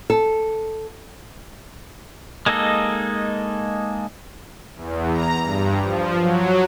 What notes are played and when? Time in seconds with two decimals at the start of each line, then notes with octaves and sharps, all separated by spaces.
0.10 A4
2.46 G#3 A#3 D#4 A4 D#5
4.76 E2
5.12 A#5
5.44 G2
5.82 F3
6.20 F#3